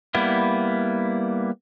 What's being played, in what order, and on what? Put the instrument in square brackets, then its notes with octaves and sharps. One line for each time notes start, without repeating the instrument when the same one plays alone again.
[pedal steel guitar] G3 A#3 B3 E4